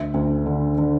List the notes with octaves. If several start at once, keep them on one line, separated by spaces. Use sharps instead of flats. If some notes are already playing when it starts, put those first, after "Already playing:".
Already playing: D2 E5
D2
D3
D3